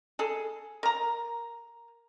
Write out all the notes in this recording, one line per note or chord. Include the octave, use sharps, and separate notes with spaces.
G#4 A4
A#4 A#5